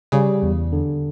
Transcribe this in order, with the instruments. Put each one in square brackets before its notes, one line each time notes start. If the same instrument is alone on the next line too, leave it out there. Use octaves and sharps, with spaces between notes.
[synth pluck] C#3 [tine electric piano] G3
[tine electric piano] E2
D3